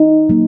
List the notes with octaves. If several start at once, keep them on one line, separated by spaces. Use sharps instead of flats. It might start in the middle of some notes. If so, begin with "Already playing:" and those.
Already playing: D#4
F#3 A#3